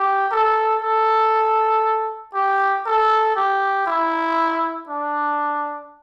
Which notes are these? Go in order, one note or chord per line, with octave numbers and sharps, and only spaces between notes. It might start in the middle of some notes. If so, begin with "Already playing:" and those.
Already playing: G4
A4
A4
G4
A4
G4
E4
D4